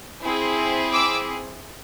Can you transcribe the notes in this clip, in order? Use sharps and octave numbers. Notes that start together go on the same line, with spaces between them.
C4 E4 G#4
D6 E6